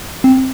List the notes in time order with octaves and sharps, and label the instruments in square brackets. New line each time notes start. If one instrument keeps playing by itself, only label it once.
[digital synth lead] C4